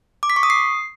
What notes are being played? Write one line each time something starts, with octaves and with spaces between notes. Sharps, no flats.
D6
B6
C#6
D#6
C7